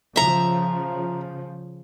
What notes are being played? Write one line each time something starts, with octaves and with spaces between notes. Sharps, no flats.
C#3 F3 E5 A#5